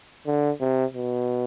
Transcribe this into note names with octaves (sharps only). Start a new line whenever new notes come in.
D3
C3
B2